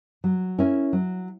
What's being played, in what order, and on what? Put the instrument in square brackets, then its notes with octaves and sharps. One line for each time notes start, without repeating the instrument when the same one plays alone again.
[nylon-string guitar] F#3
C#4 E4 A#4
F#3